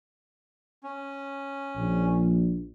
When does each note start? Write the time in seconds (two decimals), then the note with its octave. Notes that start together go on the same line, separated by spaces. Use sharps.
0.83 C#4
1.76 A#1